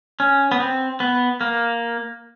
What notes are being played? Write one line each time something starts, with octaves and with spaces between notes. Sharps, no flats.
C#4
B3
C4
B3
A#3